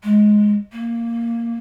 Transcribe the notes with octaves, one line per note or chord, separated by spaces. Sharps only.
G#3
A#3